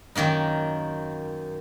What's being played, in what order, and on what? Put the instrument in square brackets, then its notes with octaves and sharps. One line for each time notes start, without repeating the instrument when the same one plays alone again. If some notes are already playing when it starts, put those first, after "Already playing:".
[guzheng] F#2 D#3 A#3 D#4